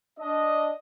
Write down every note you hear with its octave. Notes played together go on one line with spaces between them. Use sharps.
D4 D#5